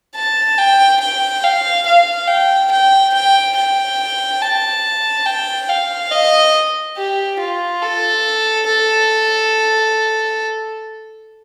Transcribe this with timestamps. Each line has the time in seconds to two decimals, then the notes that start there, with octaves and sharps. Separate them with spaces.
0.15 A5
0.58 G5
1.00 G5
1.43 F5
1.86 F5
2.28 G5
2.71 G5
3.13 G5
3.56 G5
4.42 A5
5.26 G5
5.69 F5
6.11 D#5
6.97 G4
7.39 F4
7.82 A4
8.67 A4